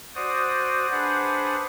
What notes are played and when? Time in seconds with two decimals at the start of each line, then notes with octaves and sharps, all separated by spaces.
0.15 F#4 C5 D5 D#6
0.91 D4 G#4 B4 C5 F#5